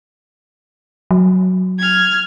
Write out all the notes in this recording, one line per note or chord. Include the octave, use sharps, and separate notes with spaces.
F#3
F6 G#6